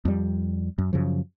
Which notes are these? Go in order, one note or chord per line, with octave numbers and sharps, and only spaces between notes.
F2 G3
F#2
F#2 C#3 F3